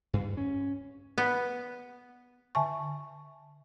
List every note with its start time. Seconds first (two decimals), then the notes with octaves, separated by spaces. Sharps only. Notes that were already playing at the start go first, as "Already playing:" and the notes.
0.13 G2
0.37 C#4
1.18 B3
2.55 D3 E5 G#5 A5 C#6